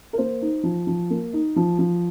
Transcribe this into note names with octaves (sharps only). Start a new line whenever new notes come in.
A#4
A#3 C5
D#4
F3
F3
A#3
D#4
F3
F3